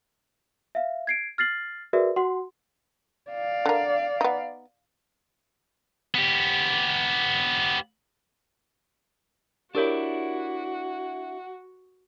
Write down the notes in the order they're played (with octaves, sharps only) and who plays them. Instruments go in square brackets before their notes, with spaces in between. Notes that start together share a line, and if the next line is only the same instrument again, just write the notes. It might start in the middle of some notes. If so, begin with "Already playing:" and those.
[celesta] E5 F5
G#6 C7 D7
F6 A6 C7 F#7
F#4 G#4 A#4 B4 D5 E5
F#4 F#5 C6
[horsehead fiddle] D5 F5
[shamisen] D3 A#4
B3 D#4
[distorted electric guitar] B3 G4
[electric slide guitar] D4 E4 [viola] F#4 [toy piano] G4 A#4 C#5 [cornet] F#5